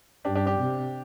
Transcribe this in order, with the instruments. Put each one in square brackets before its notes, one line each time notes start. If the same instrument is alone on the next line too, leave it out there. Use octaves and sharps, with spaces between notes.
[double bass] G2 [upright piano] D4 G4
[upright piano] D4 G4
D4 G4
[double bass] C3